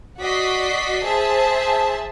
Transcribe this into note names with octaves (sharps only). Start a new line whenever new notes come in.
F#4 D5 D#5 B6 C7
G#4 C5 E5 A5